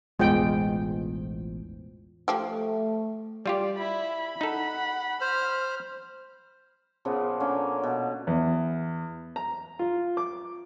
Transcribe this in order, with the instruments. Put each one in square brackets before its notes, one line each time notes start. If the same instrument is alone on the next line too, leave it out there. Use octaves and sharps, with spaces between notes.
[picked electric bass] E1 A1 E2 [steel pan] G#3 G5 [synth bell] B3 F4 C5
[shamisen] F3 G4 [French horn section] A3
[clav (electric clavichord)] G3 F4 G4 [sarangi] D5
[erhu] E4 [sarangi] B5
[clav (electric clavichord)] D#4 A4 [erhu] F#5
[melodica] C5 [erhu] F6
[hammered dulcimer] A#2 C#3 F3 B3
D3 A#3 C#4
B2
[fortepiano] E2
A#5
F4
D6